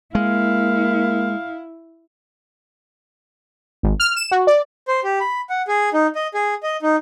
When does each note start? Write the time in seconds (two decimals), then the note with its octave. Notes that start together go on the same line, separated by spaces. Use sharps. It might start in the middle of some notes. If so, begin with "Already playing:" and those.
0.15 G#3 A#3 E4 F5
3.83 G#1
4.00 F6
4.16 E7
4.31 F#4
4.47 D5
4.88 C5
5.04 G4
5.21 B5
5.50 F#5
5.68 G#4
5.93 D#4
6.15 D#5
6.34 G#4
6.63 D#5
6.82 D#4